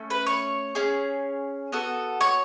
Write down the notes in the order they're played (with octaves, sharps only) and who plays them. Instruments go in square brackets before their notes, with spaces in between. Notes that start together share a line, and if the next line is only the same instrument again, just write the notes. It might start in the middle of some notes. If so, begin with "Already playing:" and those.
Already playing: [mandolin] A3 C#4
B4 B5
C#5 C#6
C#4 G#4
B3 F#4 A4
C#5 C#6